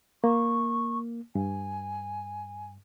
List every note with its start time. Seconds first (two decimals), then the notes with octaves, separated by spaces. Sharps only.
0.24 A#3 C#6
1.35 G2 G#5